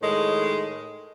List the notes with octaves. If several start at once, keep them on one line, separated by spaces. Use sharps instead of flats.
A2 D#3 G#3